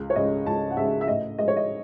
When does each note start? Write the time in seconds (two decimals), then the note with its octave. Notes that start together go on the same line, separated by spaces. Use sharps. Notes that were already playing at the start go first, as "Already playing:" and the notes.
Already playing: C#2
0.10 C#5
0.16 C#3 G#3 D#5
0.46 C#2 A5
0.71 F#5
0.77 C#3 G#3 E5
1.01 E5
1.08 A2 D#5
1.38 G#3 D#5
1.48 C#5
1.56 D#5